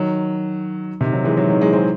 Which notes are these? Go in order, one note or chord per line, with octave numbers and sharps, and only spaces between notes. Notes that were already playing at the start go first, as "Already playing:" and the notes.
Already playing: D#3 F#3
C3 D#3
D#3 F#3
E3 G#3
D#3 F#3
D#3 F#3
E3 G#3
G#3 C4